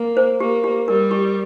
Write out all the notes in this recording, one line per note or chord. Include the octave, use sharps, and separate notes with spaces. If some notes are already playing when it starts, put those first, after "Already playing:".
Already playing: A#3
C5
A#3 G4
G4
G3 A#4
G4